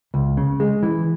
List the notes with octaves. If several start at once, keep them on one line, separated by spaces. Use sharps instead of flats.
C#2
C#3
G#3
E3